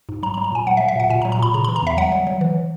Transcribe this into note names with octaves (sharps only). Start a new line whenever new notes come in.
G#2
F#3 A#5
A#5
F#3
A#5
A#2 G#5
F#3 F#5
E5
F#3
E5
A#2 F#5
A#2 G#5
A#5
F#3
A#5
A#2 B5
C#3 A#5
E3 B5
A#5
E2 E5
F#3 F#5
F#3
F#3
E3